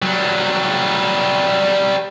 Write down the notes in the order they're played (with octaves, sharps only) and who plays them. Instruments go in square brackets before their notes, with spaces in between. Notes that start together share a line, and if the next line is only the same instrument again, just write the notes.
[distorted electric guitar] F#3 G3